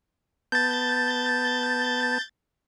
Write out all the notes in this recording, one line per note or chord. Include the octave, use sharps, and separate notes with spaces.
B3 A5 G6 A6